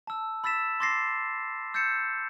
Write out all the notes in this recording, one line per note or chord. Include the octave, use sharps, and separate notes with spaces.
A5 E6
B5 E6 A6 B6 E7
C6 D6 A6 A#6 C7
E6 G6 A6 C7 C#7 E7